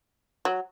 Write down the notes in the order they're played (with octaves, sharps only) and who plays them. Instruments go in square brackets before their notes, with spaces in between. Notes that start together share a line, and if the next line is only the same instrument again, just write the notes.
[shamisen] F#3